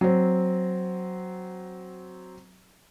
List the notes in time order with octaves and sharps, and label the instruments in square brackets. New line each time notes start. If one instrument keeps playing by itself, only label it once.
[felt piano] F#3 C4